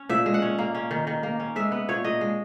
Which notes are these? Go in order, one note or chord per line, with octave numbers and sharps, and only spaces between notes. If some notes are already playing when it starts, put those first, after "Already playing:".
Already playing: C#4
A#2 E5
G#3
F#5
C#4
A#3
C#4
D#3
D#3
A#3
C#4
G#3 E5
B3
A#2 C#5
A#2 D#5
G#3